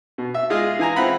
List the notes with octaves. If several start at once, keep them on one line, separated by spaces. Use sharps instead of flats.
B2
E5
G#3 F4 G#4 D#5 F5
E3 G#5 A#5
C4 E4 F4 F#5 B5